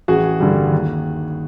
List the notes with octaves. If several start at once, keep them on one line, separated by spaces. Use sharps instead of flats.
A1 F#4 G#4
G2 D3 G3
D#2